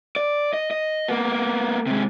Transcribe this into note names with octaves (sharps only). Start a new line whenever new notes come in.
D5
D#5
D#5
A#3 B3
C3 G#3